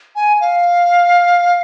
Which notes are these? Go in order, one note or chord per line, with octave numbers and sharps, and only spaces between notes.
G#5
F5